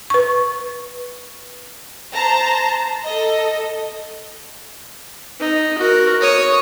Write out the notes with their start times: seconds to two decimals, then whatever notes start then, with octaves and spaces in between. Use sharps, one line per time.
0.10 B4 C#6
2.12 C5 A5 A#5
3.04 A4 D#5
5.40 D#4
5.78 F#4 A#4
6.21 C#5 D#6